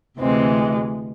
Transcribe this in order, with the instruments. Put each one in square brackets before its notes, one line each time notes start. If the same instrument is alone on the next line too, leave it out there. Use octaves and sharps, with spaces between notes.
[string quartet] D2 C3 E3 G#3 C4